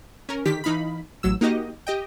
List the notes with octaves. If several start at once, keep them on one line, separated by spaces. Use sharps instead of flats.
C#4 A#4
D3 D#3 G4 B6
E3 D#4 F5 B5
A1 F#3 E6
A#3 D#4 F#4 G4 D#5
G4 D#5 G5